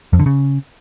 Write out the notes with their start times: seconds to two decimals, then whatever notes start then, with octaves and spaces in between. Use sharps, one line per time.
0.13 F2
0.19 D3
0.26 C#3